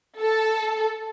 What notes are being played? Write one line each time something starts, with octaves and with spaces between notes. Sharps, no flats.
A4